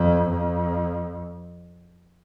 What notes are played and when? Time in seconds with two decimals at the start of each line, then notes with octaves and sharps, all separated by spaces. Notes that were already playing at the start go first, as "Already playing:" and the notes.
Already playing: F2
0.29 F2